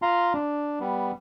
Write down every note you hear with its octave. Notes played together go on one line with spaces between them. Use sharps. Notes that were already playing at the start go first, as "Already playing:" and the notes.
F4 F5 A#5 C6
D4
G3 B3